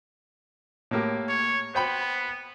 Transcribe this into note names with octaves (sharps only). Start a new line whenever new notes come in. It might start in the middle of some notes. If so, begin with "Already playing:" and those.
A2 A#3 G4
C#5
B3 C5 G5 B5